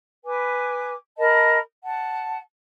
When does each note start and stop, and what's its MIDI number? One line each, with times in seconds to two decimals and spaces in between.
0.24 0.93 71
0.24 0.93 80
0.24 0.93 86
1.17 1.57 70
1.17 1.57 75
1.17 1.57 81
1.17 1.57 83
1.83 2.38 78
1.83 2.38 81